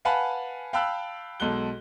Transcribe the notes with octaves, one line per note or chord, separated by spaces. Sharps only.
B4 F5 F#5 G#5 A5 B5
F5 G5 A5 B5 E6 F#6
B1 G#3 A4 F#6 G7